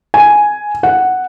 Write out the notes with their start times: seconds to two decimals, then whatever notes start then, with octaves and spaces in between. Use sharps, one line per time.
0.14 G#5
0.83 F#5